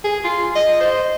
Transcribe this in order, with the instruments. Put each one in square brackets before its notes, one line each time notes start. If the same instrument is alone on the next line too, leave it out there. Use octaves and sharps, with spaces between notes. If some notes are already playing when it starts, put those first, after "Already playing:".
[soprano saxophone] G#4
F4
D#5
C5